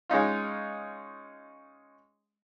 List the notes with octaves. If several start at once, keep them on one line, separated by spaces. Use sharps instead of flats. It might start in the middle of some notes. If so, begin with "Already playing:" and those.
G#3 C#4 D#4 F4